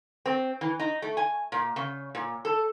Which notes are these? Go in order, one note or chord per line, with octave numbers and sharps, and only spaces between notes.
C4
E3
D#4
A3
G#5
A#2
C#3
A#2
A4